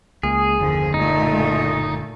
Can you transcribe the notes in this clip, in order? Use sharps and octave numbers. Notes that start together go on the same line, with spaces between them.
C#2 G#3 A#3 G#4
F#1 D#2 D3 F3
A#2 A3 D#4